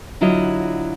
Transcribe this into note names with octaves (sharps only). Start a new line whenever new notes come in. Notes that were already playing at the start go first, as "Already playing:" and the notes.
D3 F#3 E4 F4 C#5 D#5